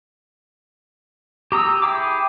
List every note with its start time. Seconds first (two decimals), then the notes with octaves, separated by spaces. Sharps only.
1.52 G4 A#5 D#6 E6
1.82 E4 G#4 G5 D6